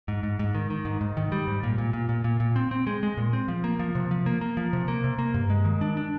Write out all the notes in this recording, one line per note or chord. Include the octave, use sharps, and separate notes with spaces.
G#2
G#2
G#2
D#3
D#3
G#2
G#2
D#3
G3
G#2
A#2
A#2
A#2
A#2
A#2
A#2
C4
C4
G#3
G#3
A#2
C4
F3
A#3
F3
C3
F3
A#3
A#3
F3
C3
A#3
C3
A#3
G2
G#3
D#3
D4
D4